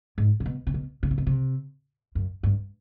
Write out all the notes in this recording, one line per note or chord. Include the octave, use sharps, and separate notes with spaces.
G#2
C3
B2
C3
B2
C#3
C3
B2
C3
F#2
G2